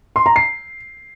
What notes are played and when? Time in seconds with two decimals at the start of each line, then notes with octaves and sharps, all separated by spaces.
0.16 C6
0.26 A#5
0.36 C7